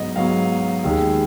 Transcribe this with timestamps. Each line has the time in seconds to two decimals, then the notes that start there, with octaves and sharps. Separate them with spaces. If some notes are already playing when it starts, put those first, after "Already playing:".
Already playing: G#2 F#3 B3 D#5
0.16 G#2 F#3 B3 F5
0.84 D#2 D#3 G#3